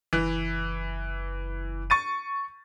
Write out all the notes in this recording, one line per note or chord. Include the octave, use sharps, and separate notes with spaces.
F#1 E3
C#6 A6 D#7